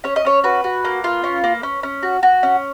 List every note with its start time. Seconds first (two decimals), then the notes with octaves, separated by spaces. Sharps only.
0.04 C#4 C#5
0.16 D#5
0.25 C#4 C#5
0.44 F#4 B4
0.64 F#4
0.85 A#3
1.04 F4
1.24 C#4
1.44 A#3
1.63 C#4
1.83 C#4
2.03 F#4
2.23 F#4
2.43 C#4